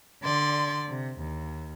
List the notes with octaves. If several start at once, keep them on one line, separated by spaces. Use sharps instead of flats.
D3 D5 C6
C3
D#2